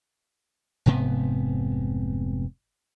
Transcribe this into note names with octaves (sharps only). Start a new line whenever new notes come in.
F1 G#2 C3 B3